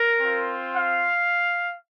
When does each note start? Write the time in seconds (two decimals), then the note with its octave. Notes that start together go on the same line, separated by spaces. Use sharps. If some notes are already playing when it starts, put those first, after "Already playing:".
Already playing: A#4
0.20 C4 F4
0.75 F5